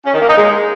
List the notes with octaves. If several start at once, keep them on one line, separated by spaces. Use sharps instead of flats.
C#4
D#3
A#3
D#4
G#3